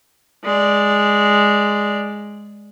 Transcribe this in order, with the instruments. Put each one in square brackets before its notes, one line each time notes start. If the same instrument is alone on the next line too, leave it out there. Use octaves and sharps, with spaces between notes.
[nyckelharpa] G#3 D5